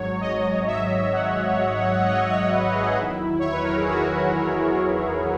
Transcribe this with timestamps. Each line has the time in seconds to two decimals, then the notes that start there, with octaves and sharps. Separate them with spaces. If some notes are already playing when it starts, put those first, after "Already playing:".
Already playing: G#1 G#2 F#3 C#5
0.21 D#5
0.67 E5
1.13 F#5
2.05 D#5
2.28 C#5
2.51 B4
2.75 G#4
2.97 E2 D#3 F#3 E4
3.39 C#5
3.52 B4
3.64 A#4
3.77 G#4
3.89 F#4